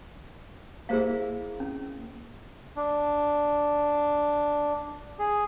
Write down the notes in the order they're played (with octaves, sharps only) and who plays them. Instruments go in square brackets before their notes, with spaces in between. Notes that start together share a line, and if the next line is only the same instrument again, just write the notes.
[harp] A#3 E4 [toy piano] G#4 C5 F5
[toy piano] C#4
[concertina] D4
G#4